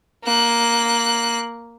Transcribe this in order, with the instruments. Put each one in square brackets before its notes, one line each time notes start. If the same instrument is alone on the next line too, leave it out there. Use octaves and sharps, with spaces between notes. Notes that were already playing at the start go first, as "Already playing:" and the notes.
[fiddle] A#3 F#6